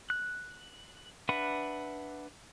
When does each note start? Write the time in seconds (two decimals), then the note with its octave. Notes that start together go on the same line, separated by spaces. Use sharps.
0.10 F#6
1.29 D4 B4 E5 F#5 B5